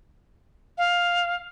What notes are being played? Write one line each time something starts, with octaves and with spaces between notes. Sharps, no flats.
F5